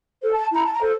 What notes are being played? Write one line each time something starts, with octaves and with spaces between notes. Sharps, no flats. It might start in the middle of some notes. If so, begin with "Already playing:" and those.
A4 C5
A5
E4 A#5
A5
A#5
A4 C5